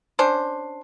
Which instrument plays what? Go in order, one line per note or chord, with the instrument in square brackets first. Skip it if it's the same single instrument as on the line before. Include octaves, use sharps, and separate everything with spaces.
[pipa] C#4 D4 C5